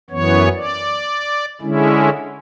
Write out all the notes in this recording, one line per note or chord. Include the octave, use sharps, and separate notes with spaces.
F#2 E3 B3 C#5
D5
D3 G#3 C#4 E4